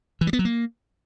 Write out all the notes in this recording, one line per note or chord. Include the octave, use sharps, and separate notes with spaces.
E3
G3
B3
F#3
A#3